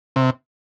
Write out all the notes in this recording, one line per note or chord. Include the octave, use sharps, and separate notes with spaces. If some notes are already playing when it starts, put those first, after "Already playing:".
C3